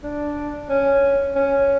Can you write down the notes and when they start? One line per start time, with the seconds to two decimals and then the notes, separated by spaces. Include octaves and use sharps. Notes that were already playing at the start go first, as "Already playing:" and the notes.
0.04 D4
0.70 C#4
1.36 C#4